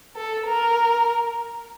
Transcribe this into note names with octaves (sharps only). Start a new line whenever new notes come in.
A4
A#4